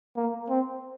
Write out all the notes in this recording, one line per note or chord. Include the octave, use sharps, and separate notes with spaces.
A#3
C4